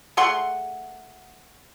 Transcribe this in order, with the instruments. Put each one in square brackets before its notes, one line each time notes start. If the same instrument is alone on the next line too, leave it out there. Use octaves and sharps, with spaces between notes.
[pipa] A3 G#4 F#5 C6